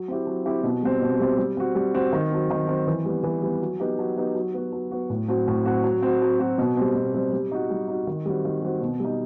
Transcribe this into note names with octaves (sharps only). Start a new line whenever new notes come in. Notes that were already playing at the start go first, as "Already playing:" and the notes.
Already playing: F#3
C4 E4 G4
F#3
C4 E4 G4
B2
G3 C4
B2
G3 C4
G3
C4 F#4
G3
C4 F#4
D#3
F#3 C4
D#3
F#3 C4
E3
G3 B3
E3
G3 B3
F#3
B3 D#4 G4
F#3
B3 D#4 G4
F#3
B3 F#4
F#3
B3 F#4
A2
F#3 C4 F#4
A2
F#3 C4 F#4
F#3
C4 F#4
F#3
C4 F#4
B2
G3 C4
B2
G3 C4
G3
D#4 F#4
G3
D#4 F#4
D#3
G3 C4 F#4
D#3
G3 C4 F#4
B2
G3 D#4